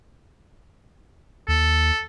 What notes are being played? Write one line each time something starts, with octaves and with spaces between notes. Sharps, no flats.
D#2 A4